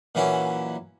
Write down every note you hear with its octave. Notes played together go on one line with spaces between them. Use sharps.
A#2 E3 F#3 C#4 E4